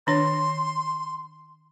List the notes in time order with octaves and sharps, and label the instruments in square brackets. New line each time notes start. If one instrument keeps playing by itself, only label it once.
[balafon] D#3 D4 C#5 [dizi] C6